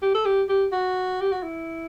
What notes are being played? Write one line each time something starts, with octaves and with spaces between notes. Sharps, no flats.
G4
A4
G4
G4
F#4
G4
F#4
E4